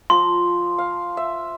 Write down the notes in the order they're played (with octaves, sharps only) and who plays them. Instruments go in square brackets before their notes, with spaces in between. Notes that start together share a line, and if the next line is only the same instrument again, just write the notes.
[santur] F3 A#5 [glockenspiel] C6
[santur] F5
E5